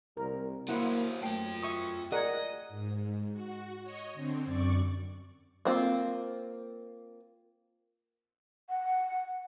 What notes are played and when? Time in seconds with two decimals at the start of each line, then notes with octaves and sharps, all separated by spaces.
0.17 C2 A#4
0.69 F#3 A#3 E4 C5 F#5
1.23 F#2 A3 F4 G5
1.63 E5 C#6 D#6
2.12 G#4 A#4 D5 D#5 F#5 G#6
2.69 G#2
3.32 F#4
3.83 C#5 D#5
4.14 D3 C4
4.45 F#2 D5 C#6
5.65 A#3 C4 F4
8.69 F#5